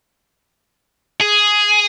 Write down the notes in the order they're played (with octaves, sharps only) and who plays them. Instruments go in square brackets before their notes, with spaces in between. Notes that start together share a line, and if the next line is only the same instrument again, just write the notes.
[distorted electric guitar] G#4